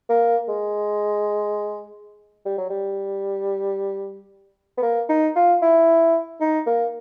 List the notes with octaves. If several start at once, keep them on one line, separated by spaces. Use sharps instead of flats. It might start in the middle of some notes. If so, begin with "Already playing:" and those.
A#3
G#3
G3
F#3
G3
B3
A#3
D#4
F4
E4
D#4
A#3